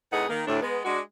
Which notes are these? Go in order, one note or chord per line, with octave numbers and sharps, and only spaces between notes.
F2 A2 D#4 G#4 B4 F#5
D#3 A#3
D2 A2 D4
G#3 B3
G#3 D4 F#4